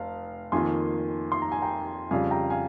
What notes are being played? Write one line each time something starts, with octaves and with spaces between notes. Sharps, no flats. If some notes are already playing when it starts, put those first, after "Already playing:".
Already playing: F1 F5
F2 D#3 A#3 G#5 C6
C6
A#5
G#5
G5 A#5
F2 C#3 G3 F5 G#5
G5 A#5
F5 G#5